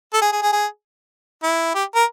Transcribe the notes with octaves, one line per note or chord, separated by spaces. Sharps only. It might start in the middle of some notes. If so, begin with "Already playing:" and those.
A4
G#4
G#4
G#4
G#4
E4
G4
A#4